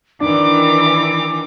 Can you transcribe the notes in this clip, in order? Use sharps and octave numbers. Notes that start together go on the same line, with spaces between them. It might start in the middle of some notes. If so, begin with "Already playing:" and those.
D#3 E3 D4 D6